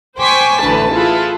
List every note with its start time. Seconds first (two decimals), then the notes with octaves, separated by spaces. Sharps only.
0.19 C5 G5 G#5 C#6 D6 B6
0.61 A1 D2 E3 B4 A5
0.91 E4 F4 G#4 A4 B4